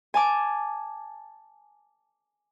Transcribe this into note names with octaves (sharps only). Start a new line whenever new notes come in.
G#5 A5 D6